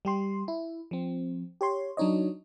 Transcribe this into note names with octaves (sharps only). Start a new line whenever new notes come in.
G3 G4 C6
E4
F3 C4
G4 C#5 C6
F#3 D4 D#4 C#5 D#5